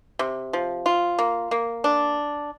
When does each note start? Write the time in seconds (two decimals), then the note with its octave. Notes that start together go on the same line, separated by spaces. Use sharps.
0.19 C3
0.53 F3
0.86 F4
1.19 A#3
1.51 A#3
1.84 D4